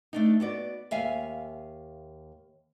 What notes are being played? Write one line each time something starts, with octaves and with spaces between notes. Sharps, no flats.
A3 D4 D#4
B3 F#4 D5
D#2 E5 F5 G#5